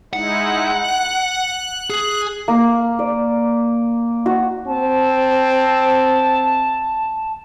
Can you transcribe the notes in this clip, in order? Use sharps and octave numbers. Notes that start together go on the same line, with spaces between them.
G#3 D#4 E4 F#5
F#6
G#4
A#3
D5
F#4
C4 A5